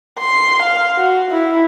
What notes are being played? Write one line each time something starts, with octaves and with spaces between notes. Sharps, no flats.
C6
F5
F#4
E4